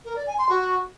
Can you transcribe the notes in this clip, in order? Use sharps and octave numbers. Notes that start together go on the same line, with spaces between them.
A#4
D5
G#5
C6
F#4